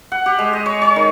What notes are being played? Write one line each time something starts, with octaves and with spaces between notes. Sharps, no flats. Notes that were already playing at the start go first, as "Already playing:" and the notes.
F#5
G4
G#3
D#5
C#5
C#5
D#3